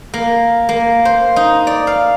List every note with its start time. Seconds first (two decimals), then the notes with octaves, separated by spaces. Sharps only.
0.14 A#3
0.69 A#3
1.05 C5
1.36 D#4
1.67 D5
1.87 F5